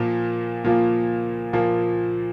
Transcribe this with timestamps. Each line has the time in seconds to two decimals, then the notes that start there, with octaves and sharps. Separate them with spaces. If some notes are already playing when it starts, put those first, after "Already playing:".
Already playing: A#2 F3 A#3
0.64 A#2 F3 A#3
1.53 A#2 F3 A#3